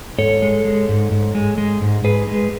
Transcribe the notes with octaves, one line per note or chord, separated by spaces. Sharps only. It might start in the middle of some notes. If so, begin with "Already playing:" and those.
G#2 A4 C#5
G#3
G#3
G#2
G#2
G#3
G#3
G#2
G#2 G#4 B4
G#3